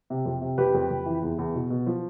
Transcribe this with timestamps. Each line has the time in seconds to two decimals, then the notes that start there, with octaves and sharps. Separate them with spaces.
0.10 C3
0.26 F2
0.42 C3
0.58 F2 G4 B4
0.74 F2
0.90 F2
1.06 E3
1.22 E2
1.38 E2
1.55 B2
1.70 B2
1.87 F3